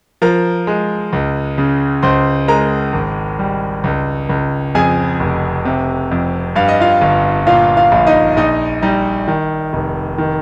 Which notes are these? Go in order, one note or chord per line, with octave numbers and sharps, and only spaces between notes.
F3 A#4 A#5
G#3
C#2
C#3
C#2 C5 C6
G#3 A#4 A#5
G#1
G3
C#2
C#2
F2 G#4 G#5
F1
C3
F2
G2 F5
D#5
F4 F5
G1
A#2 F4 F5
F4 F5
A#1
D#4 D#5
A#1 D#4 D#5
G3 D#4 D#5
D#3
F1
D#3